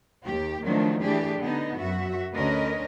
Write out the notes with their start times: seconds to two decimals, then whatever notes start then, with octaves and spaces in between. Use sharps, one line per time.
0.25 D#2 G4
0.64 D#3 F3 F#3 A3 D4
1.02 E3 A3 D4 G4 G#4
1.40 D3 B3 D#4
1.78 F#2 F#4 E5
2.34 D2 D3 C#4 A#4 B4 D#5